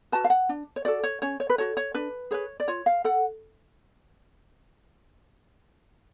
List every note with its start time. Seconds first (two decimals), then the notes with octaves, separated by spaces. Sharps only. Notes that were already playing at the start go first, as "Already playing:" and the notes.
0.12 F#4 B4 A5
0.24 F5
0.30 F#5
0.49 D4
0.76 C#5
0.85 F#4 A4 D5
1.03 C#5
1.22 C#4 C#5
1.40 C#5
1.50 B4
1.58 F#4 A4 C#5
1.77 C#5
1.94 D4 B4
2.31 G#4 B4 C#5
2.60 D5
2.68 F4 C#5
2.86 F5
3.04 A4 F#5